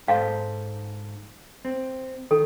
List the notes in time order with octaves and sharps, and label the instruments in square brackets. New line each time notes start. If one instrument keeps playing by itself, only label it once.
[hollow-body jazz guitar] G#2 A4 C5 [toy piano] F5
[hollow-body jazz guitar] C4
[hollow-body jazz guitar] D#3 [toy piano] A4